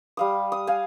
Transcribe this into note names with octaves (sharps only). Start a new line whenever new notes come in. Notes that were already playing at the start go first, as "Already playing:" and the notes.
G3 F5 D#6
D#6
F5 G#5